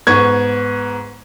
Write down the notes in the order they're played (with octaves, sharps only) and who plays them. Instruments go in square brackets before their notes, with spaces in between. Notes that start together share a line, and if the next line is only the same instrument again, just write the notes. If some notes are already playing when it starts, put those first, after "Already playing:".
[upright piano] G#2 B3 C#6 G#6